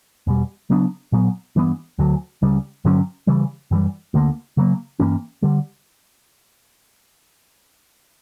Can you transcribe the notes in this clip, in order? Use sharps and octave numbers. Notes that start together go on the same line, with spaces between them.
E2 B2 G3
C#3 F#3 B3 D4
A#2 F#3 B3
G2 E3 B3
D2 D3 F#3
C#2 C#3 G3
G2 D3 F#3 C#4
C#3 E3 G3
F#2 E3 G3
D2 D3 A#3
C#3 F#3 A#3
G2 E3 A#3 C#4
D3 G3